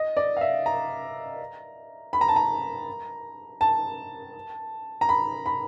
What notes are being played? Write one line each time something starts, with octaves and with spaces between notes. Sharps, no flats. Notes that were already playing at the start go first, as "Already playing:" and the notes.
Already playing: D#5
D5
F5
E5
A#5
B5
A#5
A5
A#5
A5
A#5
B5
B5